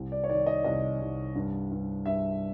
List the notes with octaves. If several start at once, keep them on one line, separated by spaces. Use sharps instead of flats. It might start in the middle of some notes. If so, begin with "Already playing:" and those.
Already playing: C2
D5
C#5
D#3 D5
D#5
C2 D#5
C2
G2
G2
G2 E5